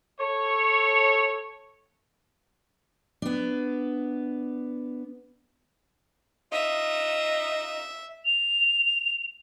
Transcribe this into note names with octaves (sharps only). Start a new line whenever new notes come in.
A4 C#5
B3 D4
D#4 F4 D#5 E5
F7